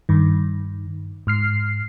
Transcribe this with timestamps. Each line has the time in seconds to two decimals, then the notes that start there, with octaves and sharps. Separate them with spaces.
0.09 G2 D#3
1.27 G#2 F6 C7